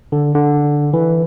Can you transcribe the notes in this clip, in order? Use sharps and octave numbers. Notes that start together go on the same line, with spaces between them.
D3
D3
E3